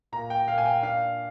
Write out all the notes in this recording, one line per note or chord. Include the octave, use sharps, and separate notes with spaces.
A#2 A#5
G5
A#2 F5
G#5
G5
D4 F5